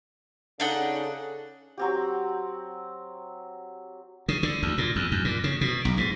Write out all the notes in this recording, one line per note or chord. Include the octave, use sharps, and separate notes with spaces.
C#3 D4 D#4 A4 F#5
F#3 C4 G4
C#3
D3
D2
A#2
E2
F#2
A#2
C#3
B2
B1
G#2